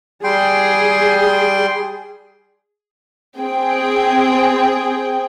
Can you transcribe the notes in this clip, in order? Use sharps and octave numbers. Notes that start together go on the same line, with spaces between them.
G3 G#4 G5 C6
C4 G#4 G5